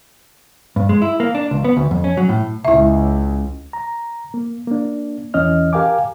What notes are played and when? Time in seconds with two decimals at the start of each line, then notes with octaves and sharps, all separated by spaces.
0.76 G2
0.89 G#3
1.02 E4
1.20 A#3
1.35 D4
1.51 C#2
1.65 B3
1.77 D2
1.91 F2
2.04 C#4
2.17 F#3
2.29 A2
2.65 C#2 E4 E5
3.73 A#5
4.34 A#3
4.67 A#3 D4
5.34 E2 E3 C#4 D#5 F6
5.73 G4 A#4 F5 G5 G#5 D6